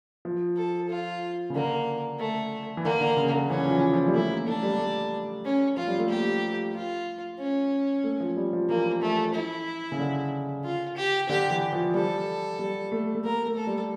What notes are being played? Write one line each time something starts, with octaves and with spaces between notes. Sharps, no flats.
F3
A4
F4
C#3
D3 A#3
A3
E3
D3 A#3
D3
C#3
D3
E3 C#4
F3
E3
F3
G3
A3 E4
A#3
A3 D4
G3
A3
C#4
F3 F4
G3
A3
A#3 G4
F4
C#4
A3
F3
G3
F3
E3 A#3
A3
E4
C#3
D3
F4
G4
D3 G4
E3
F3
G3 A4
G3
A3
A3
A#3 A#4
A3
A4
G3